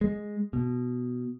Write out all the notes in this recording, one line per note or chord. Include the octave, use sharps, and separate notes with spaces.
G#3
B2